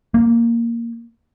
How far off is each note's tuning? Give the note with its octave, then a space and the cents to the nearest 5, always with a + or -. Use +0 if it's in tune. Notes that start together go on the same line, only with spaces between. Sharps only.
A#3 -5